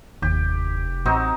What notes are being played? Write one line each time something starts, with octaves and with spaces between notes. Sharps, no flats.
F1 D#2 G4
A1 F#3 C4 D#4